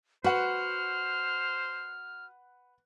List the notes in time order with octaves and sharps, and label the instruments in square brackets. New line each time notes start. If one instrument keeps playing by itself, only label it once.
[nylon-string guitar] F#4 [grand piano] B4 F#5 [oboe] C5 [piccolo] F6